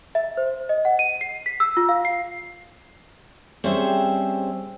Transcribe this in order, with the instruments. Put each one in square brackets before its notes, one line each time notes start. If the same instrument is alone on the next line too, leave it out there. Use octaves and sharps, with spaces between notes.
[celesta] E5
C5
D#5
F#5
D#7
C7
B6
E6
F4
F5
C7
[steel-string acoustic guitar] G3 C4 C#4 G#4 C5 E5